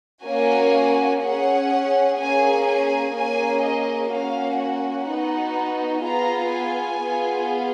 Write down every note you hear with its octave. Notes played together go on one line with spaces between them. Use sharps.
A#3 C#4 F#4 G#5
C#4 G#4 F#5
A#3 C#4 G#4 G#5
G#5
A#3 C#4 G#4 G#5
D#5
A#3 C#4 F#4 F5
F#5
B3 D#4 F#4
B3 F4 G#4 A#5
G#5
B3 F4 G#4